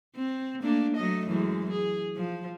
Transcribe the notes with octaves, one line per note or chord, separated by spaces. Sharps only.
C4
A3 A#3 D4
F#3 A3 D#5
F#2 E3 G#3
G#4
F3